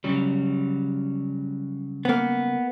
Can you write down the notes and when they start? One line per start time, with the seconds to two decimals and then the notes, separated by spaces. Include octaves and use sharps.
0.04 C#3 F#3 G3
2.05 A#3 B3